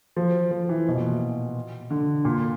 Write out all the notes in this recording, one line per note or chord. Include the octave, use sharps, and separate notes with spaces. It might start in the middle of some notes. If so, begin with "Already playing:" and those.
F3
F3
E3
B2
A#2
D3
A#2